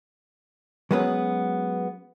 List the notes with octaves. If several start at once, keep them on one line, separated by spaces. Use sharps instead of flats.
F#3 G#3 B3 C#4 B4